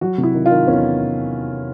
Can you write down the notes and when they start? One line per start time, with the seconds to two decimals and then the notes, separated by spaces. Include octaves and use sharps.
0.01 F#3 F#4
0.18 C3
0.23 E4
0.34 D#3
0.46 D#3 F4
0.68 E2 C#4